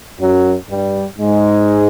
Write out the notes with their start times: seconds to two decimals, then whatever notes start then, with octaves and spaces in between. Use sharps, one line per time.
0.20 F#2 F#3
0.69 G2 G3
1.18 G#2 G#3